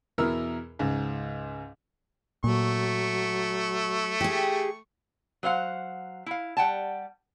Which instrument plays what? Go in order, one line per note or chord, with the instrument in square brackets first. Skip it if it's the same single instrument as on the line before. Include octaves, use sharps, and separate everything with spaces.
[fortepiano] E2 B2 E4 A#4 E6 F6
C#2 G#2
[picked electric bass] A#2 [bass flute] F#3 [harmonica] A3 C#6
[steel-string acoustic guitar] G4 G#4
[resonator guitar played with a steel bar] F#3 C5 F5 F#5
E4 F5
G3 F#5 G5 A5